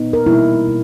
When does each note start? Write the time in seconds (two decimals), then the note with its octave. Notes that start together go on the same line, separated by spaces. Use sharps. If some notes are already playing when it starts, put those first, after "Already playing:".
Already playing: A#2 B3 D#4
0.13 A#4
0.26 B2 G3 A#3 D#4 E4
0.68 B2